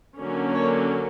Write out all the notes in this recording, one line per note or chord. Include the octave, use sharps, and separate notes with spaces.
D3 F#3 A#3 C#4
C#5